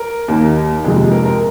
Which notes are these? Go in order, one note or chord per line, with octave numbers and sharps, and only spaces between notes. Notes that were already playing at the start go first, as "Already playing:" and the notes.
Already playing: A#4
D#2 D#3 A#3
F2 C3 G#3
A#4
A#4